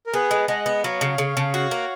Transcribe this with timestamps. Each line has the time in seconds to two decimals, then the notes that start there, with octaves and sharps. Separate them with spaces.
0.06 A#4
0.14 B3 G#4 B4
0.31 G#3
0.48 G#3 D#5 F#5
0.66 B3
0.84 F#3 C#5 F5
1.01 C#3
1.18 C#3
1.37 C#3
1.54 F#4
1.71 A#3